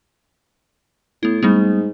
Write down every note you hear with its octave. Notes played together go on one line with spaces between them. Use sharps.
A2 B3 E4
G#2 G3 A3 B3